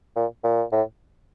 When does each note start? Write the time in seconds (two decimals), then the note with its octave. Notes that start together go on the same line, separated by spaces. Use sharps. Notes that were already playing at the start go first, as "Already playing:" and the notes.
0.16 A#2
0.44 A#2
0.72 A2